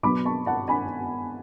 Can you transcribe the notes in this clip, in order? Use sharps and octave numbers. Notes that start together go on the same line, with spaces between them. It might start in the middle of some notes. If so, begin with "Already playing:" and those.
B2 F#3 B3 B5 D6
A5 C#6
F#5 A5
G#5 B5